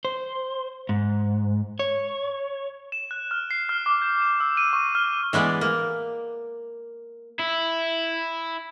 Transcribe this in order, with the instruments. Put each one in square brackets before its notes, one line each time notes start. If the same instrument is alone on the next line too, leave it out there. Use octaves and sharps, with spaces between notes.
[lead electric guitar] C5
G#2
C#5
[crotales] E7
F#6
F6
C7
F6
D6
G6
E7
E6
D#7
C#6
F6
[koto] E3 G#3 B3 D5
A#3
[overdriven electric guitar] E4